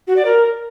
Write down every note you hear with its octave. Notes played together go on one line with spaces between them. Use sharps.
F#4
D5
A#4